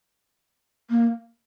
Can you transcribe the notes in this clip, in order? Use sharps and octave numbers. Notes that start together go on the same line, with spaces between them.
A#3